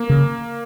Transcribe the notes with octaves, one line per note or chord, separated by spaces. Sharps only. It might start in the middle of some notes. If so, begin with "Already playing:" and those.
Already playing: A#3
C#3